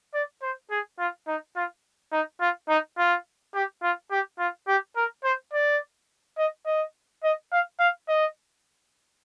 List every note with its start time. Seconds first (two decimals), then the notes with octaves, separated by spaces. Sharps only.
0.14 D5
0.42 C5
0.70 G#4
0.99 F4
1.27 D#4
1.56 F4
2.12 D#4
2.40 F4
2.69 D#4
2.97 F4
3.54 G4
3.82 F4
4.11 G4
4.39 F4
4.67 G4
4.96 A#4
5.24 C5
5.53 D5
6.38 D#5
6.66 D#5
7.23 D#5
7.52 F5
7.79 F5
8.08 D#5